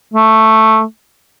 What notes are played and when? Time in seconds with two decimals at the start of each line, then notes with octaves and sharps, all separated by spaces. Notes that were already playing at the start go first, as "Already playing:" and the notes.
0.14 A3